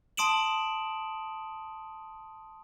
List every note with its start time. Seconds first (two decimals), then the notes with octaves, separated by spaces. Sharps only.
0.17 A5 C6 D#6 D7 E7 F#7